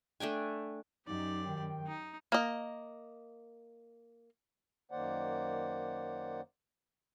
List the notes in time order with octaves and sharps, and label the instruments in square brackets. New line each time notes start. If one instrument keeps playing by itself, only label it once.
[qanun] A3 D4 G5 G#5
[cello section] F#2 [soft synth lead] D#4 [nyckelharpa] G4 D5
[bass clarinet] D#3 [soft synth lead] G5
[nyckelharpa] D#4
[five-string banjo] A#3 D#5
[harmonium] F#2 D#3 A#3 C5 D5 F#5